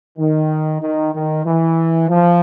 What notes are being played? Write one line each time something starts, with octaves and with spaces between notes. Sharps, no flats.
D#3
D#3
D#3
E3
F3